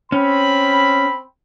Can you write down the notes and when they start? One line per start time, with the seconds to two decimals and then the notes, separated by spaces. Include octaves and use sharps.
0.12 C4 C#4 B5